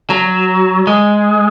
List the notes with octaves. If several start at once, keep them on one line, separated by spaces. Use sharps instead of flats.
F#3
G#3